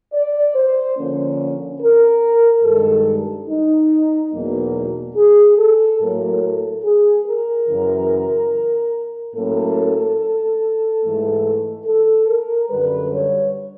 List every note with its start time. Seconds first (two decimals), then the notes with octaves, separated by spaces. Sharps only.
0.13 D5
0.55 C5
0.97 D3 F3 A#3 C#4
1.81 A#4
2.64 G2 D#3 G#3 A4
3.48 D#4
4.32 E2 B2 F#3 A#3 D#4
5.15 G#4
5.58 A4
5.99 A2 F#3 A#3 A#4
6.41 A4
6.83 G#4
7.26 A#4
7.67 F#2 C#3 E3
9.35 A2 F#3 A#3 C#4 A4
11.02 G#2 E3 A3
11.86 A4
12.28 A#4
12.70 F#2 D3 G3 B4
13.11 C#5